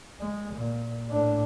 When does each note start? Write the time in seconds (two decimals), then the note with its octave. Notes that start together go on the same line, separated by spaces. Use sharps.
0.20 G#3
0.54 A#2
1.10 A2 D4